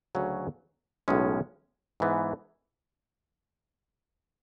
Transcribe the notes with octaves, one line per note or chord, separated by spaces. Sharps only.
D2 C#3 F#3 C#4
B1 A2 G#3 C#4
G#2 E3 B3